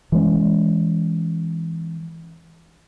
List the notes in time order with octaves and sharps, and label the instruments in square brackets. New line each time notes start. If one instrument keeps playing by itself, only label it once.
[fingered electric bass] E3 G#3 C#4